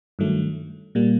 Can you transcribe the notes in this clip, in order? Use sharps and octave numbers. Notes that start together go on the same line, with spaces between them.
G2 D#3 F#3 A3
A#2 G3 A#3